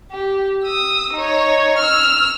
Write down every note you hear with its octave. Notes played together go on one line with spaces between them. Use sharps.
G4
D#6 E6
D#4 C#5
E6 F6